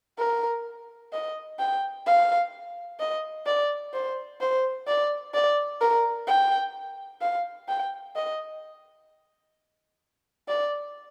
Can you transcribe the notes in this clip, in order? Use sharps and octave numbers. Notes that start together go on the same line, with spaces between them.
A#4
D#5
G5
F5
D#5
D5
C5
C5
D5
D5
A#4
G5
F5
G5
D#5
D5